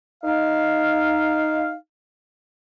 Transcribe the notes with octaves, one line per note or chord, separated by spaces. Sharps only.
D#4 F5